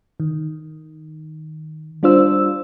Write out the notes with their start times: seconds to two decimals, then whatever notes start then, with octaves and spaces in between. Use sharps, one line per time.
0.20 D#3
2.03 G3 D4 F4 C5 E6